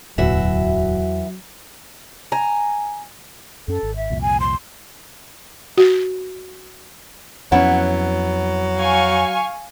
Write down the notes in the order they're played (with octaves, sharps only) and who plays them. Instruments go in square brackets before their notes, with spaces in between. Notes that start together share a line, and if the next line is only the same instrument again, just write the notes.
[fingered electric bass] D1 B2 [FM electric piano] E2 [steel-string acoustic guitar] E3 F#4 E5 [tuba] F#3
[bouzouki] G#5 A#5
[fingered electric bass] F#2 C#4 [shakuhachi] A4
[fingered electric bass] G#1
[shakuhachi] E5
[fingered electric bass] C2 F2 A#2
[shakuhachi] G#5
C6
[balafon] F#4
[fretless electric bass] F2 C#4 [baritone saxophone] F#3 [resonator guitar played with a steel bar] B3 E4 F#5
[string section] F5 G#5 C#6